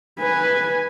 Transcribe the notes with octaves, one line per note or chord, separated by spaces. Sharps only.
B4 G#5